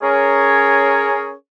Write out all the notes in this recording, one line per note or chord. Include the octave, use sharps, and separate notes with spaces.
C#4 G#4 A#4 C#5